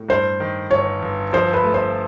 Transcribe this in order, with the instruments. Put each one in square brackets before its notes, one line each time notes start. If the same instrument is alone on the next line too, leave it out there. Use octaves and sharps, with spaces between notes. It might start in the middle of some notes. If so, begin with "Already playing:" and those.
Already playing: [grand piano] A2
[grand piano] G2 [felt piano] C5
[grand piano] D#3
[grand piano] G1 [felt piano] C#5
[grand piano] G1
[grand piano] F3 [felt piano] C5
[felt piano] B4
[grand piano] A3
[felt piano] C5